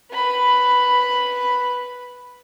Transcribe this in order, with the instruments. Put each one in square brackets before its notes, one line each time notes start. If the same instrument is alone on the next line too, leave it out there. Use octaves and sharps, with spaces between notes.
[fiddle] B4 B5